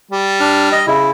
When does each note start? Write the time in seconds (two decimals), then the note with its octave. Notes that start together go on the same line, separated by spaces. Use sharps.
0.11 G3
0.40 D4 F6
0.72 D#5
0.87 C#3 E4